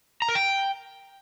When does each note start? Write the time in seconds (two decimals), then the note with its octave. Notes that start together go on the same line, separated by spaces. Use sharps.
0.22 A#5
0.29 A#4
0.35 G5